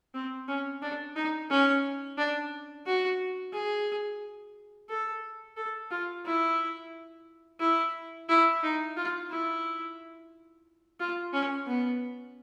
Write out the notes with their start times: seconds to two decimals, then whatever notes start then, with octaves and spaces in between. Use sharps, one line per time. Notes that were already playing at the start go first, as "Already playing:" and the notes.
0.14 C4
0.48 C#4
0.82 D4
1.15 D#4
1.50 C#4
2.18 D4
2.86 F#4
3.53 G#4
4.89 A4
5.57 A4
5.91 F4
6.25 E4
7.60 E4
8.29 E4
8.63 D#4
8.96 F4
9.30 E4
11.00 F4
11.33 C#4
11.67 B3